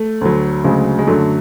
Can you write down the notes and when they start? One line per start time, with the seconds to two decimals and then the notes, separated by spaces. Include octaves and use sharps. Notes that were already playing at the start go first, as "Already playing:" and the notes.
Already playing: A3
0.21 D2 D3 F#3
0.64 D2 C#3 F#3 G#3
0.99 G#3
1.07 F#2 D3 F#3 A3